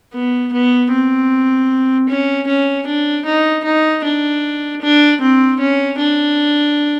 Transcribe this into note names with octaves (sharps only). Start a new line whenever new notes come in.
B3
B3
C4
C#4
C#4
D4
D#4
D#4
D4
D4
C4
C#4
D4